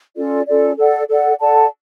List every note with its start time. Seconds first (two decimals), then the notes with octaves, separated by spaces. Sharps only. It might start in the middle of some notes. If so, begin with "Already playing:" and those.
0.16 C#4 F4 A4 D5
0.47 C#4 F4 A4 D5
0.78 A4 D5 F#5
1.09 A4 D5 F#5
1.39 A4 D5 F#5 A5